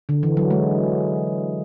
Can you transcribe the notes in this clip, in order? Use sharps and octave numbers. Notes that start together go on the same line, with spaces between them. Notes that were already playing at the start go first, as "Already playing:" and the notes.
D3
E3
F#3
G#3